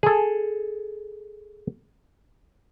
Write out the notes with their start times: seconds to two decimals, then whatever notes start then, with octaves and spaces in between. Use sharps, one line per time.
0.03 G#4 A4